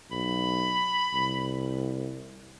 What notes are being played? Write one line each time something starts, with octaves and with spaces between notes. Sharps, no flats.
B1 B5
C2